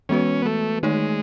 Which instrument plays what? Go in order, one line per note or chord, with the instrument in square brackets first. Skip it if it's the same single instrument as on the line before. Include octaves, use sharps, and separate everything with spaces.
[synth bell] E3 G#3 B3 F#4 B4 [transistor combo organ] C#4
[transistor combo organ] B3
A3
[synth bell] D#3 A3 D#4 G#4 C#5 [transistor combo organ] G#3